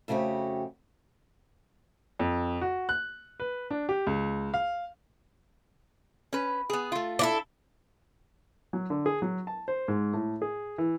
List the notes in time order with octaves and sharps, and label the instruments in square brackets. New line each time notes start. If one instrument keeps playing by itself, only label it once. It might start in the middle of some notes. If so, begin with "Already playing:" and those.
[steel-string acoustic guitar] F2 C#3 A3 F#4 G4
[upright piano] F2
F#4
F#6
B4
D4
G4
C#2
F5
[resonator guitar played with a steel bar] C#4 B4
B3 G#4
A3 F4
[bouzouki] D4 E4 A4
[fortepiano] F#3
D3
G#4
F#3
A5
C5
G#2
A2
G#4
E3